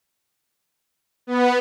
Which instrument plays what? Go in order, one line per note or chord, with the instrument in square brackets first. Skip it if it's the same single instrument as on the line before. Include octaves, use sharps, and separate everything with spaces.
[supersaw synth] B3